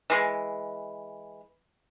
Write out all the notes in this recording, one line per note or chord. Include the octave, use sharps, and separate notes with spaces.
E3 G#3